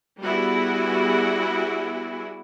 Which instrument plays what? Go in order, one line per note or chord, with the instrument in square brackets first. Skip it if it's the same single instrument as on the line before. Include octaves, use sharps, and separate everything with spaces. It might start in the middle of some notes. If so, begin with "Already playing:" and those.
[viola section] G3 B3 E4 F#4 G#4